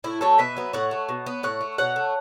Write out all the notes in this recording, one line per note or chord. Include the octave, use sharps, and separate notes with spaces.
A2 E4
F#3 A3 A4 C#5
B2 B4 E5
F#3 B3
A2 C#5 F#5
A3
B2
B3
A2 C#5 F#5
A3
B2 C#5 F#5
A3